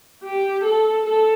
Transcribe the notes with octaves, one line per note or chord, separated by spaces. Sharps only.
G4
A4
A4